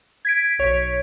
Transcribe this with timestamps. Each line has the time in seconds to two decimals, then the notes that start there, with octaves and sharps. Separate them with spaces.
0.25 G#6 B6 D7
0.59 B1 C#5